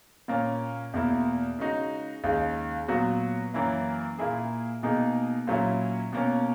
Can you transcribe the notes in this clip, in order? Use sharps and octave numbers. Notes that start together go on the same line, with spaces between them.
A#2 A#3 C#4
E2 B2 A#3 E4
C#3 G#3 D#4 F#4
D#2 C#3 G#3 D#4
A#2 F#3 B3 F#4
F#2 E3 A#3 E4
A#2 A#3 E4 G#4
B2 A#3 D#4 G#4
A#2 F#3 C#4 E4
B2 A#3 C#4